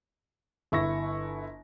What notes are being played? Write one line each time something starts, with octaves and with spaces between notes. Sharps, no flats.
G1 E4 C#6 A#6